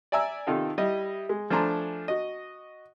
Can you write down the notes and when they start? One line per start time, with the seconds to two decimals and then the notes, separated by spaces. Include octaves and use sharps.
0.12 D5 E5 G#5 A#5 E6
0.47 C3 D#3 D#4 F4 A4
0.78 G3 E4 D#5
1.29 G#3
1.50 F3 A3 D4 G#5 A#5 C6
2.08 F#4 D#5